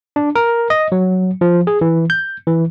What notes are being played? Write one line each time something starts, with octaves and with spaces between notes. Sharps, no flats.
D4
A#4
D#5
F#3
F3
G#4
E3
G6
E3